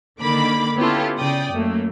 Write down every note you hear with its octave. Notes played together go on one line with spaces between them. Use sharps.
D3 D#3 A#3 B5 D6
B3 C#4 E4 F4 G4 A4
C#3 D5 G5 D#6
F#2 A3 A#3